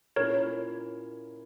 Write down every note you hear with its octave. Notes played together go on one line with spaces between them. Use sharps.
A#2 A#3 C#4 E4 A#4 C#5